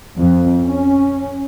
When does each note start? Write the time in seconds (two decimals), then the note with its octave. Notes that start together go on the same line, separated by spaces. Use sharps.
0.17 F2
0.65 C#4